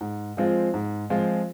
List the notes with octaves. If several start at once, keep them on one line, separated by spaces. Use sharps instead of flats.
G#2
F3 G#3 C4 F4
G#2
F3 G#3 C4 F4